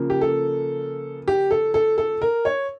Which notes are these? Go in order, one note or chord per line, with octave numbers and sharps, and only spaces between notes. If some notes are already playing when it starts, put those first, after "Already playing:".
Already playing: C#3 F3 A#3
G4
A4
G4
A4
A4
A4
A#4
C#5